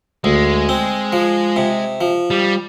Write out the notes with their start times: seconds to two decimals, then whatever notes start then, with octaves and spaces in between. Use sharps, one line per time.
0.24 D2 G#3
0.69 C4
1.12 F3
1.56 C3
2.01 F3
2.30 G3